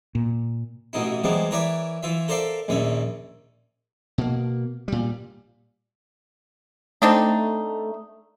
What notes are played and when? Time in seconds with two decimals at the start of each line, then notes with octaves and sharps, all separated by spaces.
0.15 A#2
0.93 A1 B2 E3 D#4 E4
1.24 E3 F3 G3 G#3 A#3 B3
1.51 E3 A#4 B4 C#5 D5 E5
2.03 E3 F4 E5
2.28 A4 A#4 C5 D5 E5 F5
2.68 A#1 D#2 A#2 C#4 E5
4.18 B2 A#3
4.88 A#2 G3
7.02 A3 C4 D4 D#4